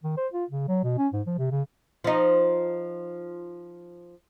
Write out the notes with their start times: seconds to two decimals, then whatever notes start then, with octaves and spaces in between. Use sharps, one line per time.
0.04 D#3
0.17 C5
0.34 F4
0.50 C#3
0.68 F#3
0.84 B2
0.98 C#4
1.13 G#2
1.27 F3
1.38 C3
1.51 C#3
2.04 F3 D#4